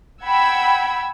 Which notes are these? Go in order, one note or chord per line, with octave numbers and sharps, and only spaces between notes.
F#5 G5 B5 E6 G#6